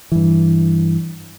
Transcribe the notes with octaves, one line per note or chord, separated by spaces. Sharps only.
G2 E3